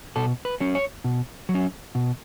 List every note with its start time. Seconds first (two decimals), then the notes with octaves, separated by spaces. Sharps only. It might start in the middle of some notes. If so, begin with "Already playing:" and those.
0.16 B2 A4
0.45 B4
0.60 F#3 C#4
0.75 C#5
1.04 B2
1.49 F#3
1.54 C#4
1.95 B2